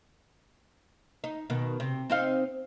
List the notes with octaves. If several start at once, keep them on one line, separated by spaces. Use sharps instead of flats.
D#4
B2 D#3
C3
C4 D#4 F5